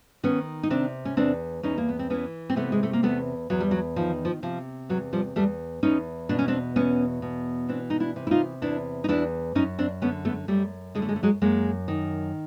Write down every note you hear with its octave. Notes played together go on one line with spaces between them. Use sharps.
D#3 B3 C#4
D#4
C3 C4 D4
C#4
E2 C4 D4
E2 C#4 D#4
A#3
B3
C4
E3 B3 C#4
C4
C3 A3 B3
G#3
A3
A#3
E2 A3 B3
E2 F#3
G3
F#3
D#3 F3
F3
C3 F3
E2 F#3
F3 G3
E2 G3 A3
E2 C#4 D#4
B2 D4
C#4
C4 D4
E2 B3 C#4
B2
E3 C4 D4
D#4
D4 E4
C3
E4
D#4 F4
E2 D4 E4
D#4
E2 D4 E4
F#2 C#4 D#4
C4 D4
D3 B3 C#4
A3 B3
F#2 G3 A3
D3 G#3
A3
G#3
A3
F#3 G#3
F#2 G#3 A#3
D#3